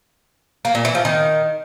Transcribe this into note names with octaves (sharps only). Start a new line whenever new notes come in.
A#3
A#2
E3
F3
D#3